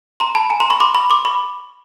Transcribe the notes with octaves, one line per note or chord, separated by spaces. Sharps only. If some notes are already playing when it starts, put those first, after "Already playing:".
A#5 C6
A5 B5
G#5 A#5
A#5 C6
B5 C#6
C6 D6
B5 C#6
C6 D6
B5 C#6